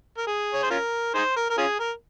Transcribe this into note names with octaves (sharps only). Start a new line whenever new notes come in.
A#4
G#4
C#5
C5
C#4 F4 A#4
D#4 G#4 C5
A#4
A#4
C#4 F4 G#4
A#4